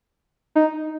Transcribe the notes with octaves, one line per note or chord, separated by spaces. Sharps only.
D#4